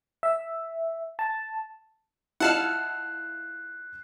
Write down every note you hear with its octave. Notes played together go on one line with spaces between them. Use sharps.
E5
A5
E4 F4 D#5 F#5 A5 F6 F#6 C7